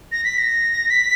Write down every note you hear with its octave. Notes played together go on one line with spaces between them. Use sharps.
A#6
B6
A#6
B6